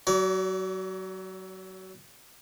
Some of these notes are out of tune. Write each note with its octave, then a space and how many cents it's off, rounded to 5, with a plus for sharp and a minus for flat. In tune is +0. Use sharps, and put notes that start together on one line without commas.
F#3 +25 D5 -35